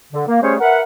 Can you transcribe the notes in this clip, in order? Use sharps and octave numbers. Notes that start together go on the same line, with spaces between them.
D3
A#3
G3 A3 C#4 G#4 C5 C#5
A#4 B4 E5 F#5